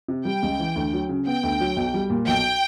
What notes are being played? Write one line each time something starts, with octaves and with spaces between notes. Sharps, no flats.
C3
G3 G5
C#2
E3
D2
F#3
C#3
B3 G5
D2
F#3
B1
G3
A#2
B1 G5